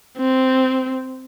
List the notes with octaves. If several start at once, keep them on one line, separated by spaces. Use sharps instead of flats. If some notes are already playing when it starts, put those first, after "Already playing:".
C4